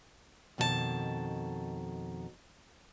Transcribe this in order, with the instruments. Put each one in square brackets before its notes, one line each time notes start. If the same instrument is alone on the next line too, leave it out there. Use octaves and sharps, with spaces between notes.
[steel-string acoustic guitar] F2 B2 D#3 F4 A5